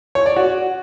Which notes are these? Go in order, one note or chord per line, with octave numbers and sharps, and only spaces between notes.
C#5
D5
F#4